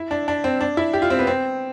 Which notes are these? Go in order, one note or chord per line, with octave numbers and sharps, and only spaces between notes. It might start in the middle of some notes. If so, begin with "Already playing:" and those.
Already playing: E4
D4
D4
C4
D4
E4
G4
F4
C4
B3
C4